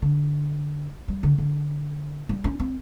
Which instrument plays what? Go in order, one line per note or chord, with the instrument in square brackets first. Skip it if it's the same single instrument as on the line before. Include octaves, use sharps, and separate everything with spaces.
[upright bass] D3
G3
D3
D3
G3
C#4
C4